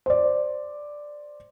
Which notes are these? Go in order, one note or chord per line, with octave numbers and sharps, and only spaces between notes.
C5 D5